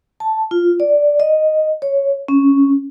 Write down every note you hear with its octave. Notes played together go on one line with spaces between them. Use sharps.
A5
F4
D5
D#5
C#5
C#4